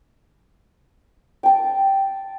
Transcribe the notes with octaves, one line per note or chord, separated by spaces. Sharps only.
G5 A5